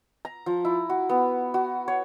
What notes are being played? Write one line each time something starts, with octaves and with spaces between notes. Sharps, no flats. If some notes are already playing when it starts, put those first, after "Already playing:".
A#5
F3
E4
F#4
B3
F#4
C#5